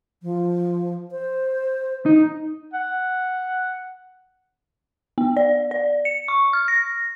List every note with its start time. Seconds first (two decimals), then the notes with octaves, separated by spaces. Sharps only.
0.22 F3
1.11 C5
2.06 D#4
2.74 F#5
5.18 B3
5.37 D5
5.71 D5
6.05 C#7
6.28 C#6
6.53 F6
6.68 A#6